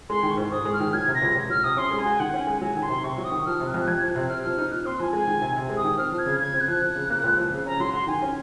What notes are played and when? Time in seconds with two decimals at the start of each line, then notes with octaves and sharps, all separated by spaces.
0.09 G#3 C6
0.23 D#3
0.30 C#6
0.37 G#2
0.52 G#2 D#6
0.65 G#3
0.73 F6
0.80 D#3
0.93 F#3 G#6
1.07 C3
1.14 A#6
1.22 C#2
1.35 C#2
1.50 F#3 F6
1.64 C3 D#6
1.77 C#4 C6
1.91 G#3
1.99 G#5
2.06 F#4
2.19 D#3 F#5
2.34 C#4
2.40 G#5
2.47 G#3
2.61 F#3 G#5
2.76 D#3
2.82 C6
2.89 C3
3.04 C3 C#6
3.18 F#3
3.24 D#6
3.31 D#3
3.46 F3 F6
3.60 C3
3.67 F#6
3.74 F2
3.87 F2 G#6
4.01 F3
4.09 F#6
4.16 C3
4.29 C4 F6
4.44 F3
4.58 D#4
4.71 A#2 F#6
4.85 C4 C6
5.00 F3 G#5
5.13 G#3 G#5
5.27 D#3
5.41 C3
5.56 C3
5.70 G#3
5.77 D#6
5.84 D#3
5.98 C4 F6
6.12 F3
6.18 G#6
6.26 C#3
6.40 C#3 G#6
6.54 C4
6.61 F#6
6.68 F3
6.82 F3
6.95 C#3
7.10 A#3
7.23 C#2
7.37 F3
7.52 C#3
7.66 C#4 A#5
7.80 F#3 C6
7.93 F#4 C6
8.07 D#3 G#5
8.22 C#4